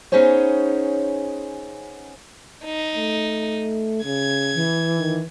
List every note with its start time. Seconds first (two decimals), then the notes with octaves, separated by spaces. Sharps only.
0.12 B3 C#4 D#4 G#4 C5 C#5
2.65 D#4
2.95 A3
4.04 C#3 G#6
4.55 E3
4.98 D#3